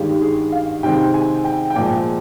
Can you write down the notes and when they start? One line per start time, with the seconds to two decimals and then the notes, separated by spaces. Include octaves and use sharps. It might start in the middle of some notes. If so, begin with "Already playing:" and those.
Already playing: G2 D#3 G#3 G4
0.21 G#4
0.52 F5
0.83 C3 D#3 G#3 C4 G5
1.14 G#5
1.44 G5
1.70 G5
1.75 A#2 F3 G#3 G#5